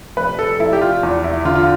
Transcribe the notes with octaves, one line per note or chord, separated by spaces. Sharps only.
F1 B4
A4
F1 E4
G4
F4
E2
E4
D3 F4
F4